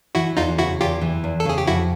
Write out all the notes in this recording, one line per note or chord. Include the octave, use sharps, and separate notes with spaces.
E3 E4 F#4
E2 D#4 F4
C#3 E4 F#4
E2 F4 G4
E3
E2
A4
C#3 G#4
G4
F2 E4 F#4